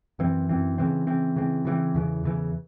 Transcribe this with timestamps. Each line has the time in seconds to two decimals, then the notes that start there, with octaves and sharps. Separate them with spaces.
0.19 F#2 E3 C4
0.49 F#2 E3 C4
0.78 C#3 E3 C4
1.07 C#3 E3 C4
1.36 C#3 E3 C4
1.65 C#3 E3 C4
1.94 E2 C#3 E3
2.24 E2 C#3 E3